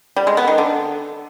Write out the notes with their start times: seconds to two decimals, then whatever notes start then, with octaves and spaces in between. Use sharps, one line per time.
0.16 G3
0.27 G#3
0.37 B3
0.48 D#3
0.58 D3